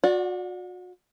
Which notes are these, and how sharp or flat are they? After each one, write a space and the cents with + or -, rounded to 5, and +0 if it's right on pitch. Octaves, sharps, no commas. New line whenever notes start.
F#4 -35 D5 +0 F#5 +0